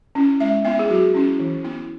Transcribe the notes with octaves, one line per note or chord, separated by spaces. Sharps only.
C#4 E4
G#3 E5
B3 E4 E5
G#4
F#3 F#4
C#4 E4
E3
B3 E4